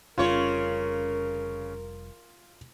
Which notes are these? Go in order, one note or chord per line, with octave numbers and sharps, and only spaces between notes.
F1 F2 C#3 G3 F4 A#4 C#5